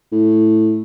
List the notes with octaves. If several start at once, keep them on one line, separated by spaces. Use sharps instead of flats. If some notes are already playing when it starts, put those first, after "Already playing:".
A2